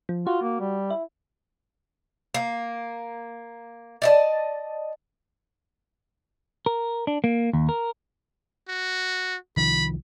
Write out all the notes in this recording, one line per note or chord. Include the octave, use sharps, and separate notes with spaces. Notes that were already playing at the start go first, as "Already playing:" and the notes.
F3
F4 F#4
A#3
G3
E4
A#3
D5 D#5 A5
A#4
D4
A#3
D#2
A#4
F#4
C2 D#3 F3 B5